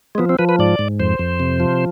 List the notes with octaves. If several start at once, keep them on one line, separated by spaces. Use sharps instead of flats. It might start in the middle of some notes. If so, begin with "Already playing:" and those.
G#3
F3 B3
C4
F3 B4
B4
G#2 D5
G#2
F2 C5
F2
C3
F3